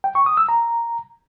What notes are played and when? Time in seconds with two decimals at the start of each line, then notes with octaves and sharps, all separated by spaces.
0.04 G5
0.15 C#6
0.26 D#6
0.37 E6
0.49 A#5